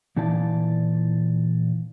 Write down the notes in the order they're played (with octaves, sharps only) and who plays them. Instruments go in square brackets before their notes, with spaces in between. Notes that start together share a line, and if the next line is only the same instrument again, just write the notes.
[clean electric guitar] A#2 E3 D#4 E4 D5 A5